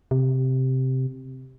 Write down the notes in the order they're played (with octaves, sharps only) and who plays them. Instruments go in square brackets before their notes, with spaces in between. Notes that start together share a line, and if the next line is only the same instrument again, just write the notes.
[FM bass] C3